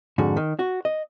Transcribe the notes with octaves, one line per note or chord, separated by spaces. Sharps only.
F2 G#2 D3 F#4
D#3
F#4
D#5